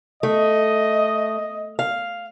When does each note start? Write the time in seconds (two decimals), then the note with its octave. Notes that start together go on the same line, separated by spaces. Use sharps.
0.23 A3 D#5
1.79 F5